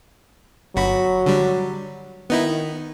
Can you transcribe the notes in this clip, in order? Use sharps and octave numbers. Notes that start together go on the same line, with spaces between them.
G1 F#3 F#4 B5
D3 G3
D#3 B3 D#4 E4